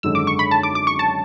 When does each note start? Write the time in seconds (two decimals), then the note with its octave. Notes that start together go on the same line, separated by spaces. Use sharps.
0.03 G#1 F#2 D3 G#3 E6
0.15 D6
0.27 C#6
0.39 B5
0.51 A5
0.63 D6
0.75 D6
0.87 C#6
0.99 A5